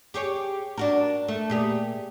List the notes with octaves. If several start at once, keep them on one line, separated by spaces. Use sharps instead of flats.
G4 G#4 C#5
D4 F#4 A#4
A3
A#2 G4 G#4